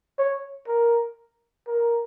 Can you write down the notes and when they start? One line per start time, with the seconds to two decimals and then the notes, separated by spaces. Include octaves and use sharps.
0.19 C#5
0.68 A#4
1.67 A#4